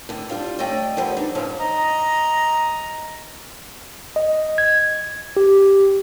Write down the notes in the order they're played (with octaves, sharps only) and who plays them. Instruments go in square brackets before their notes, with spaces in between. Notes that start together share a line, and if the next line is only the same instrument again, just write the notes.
[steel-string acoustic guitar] A2 D3
G3 D4 F4
A3 D5 D#5 G5
D3 F3 G3 B3
D4 D#4
G2 D3 F3 C#4 D#4 C5
[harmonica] D#5 A#5
[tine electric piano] D#5
G#6
G4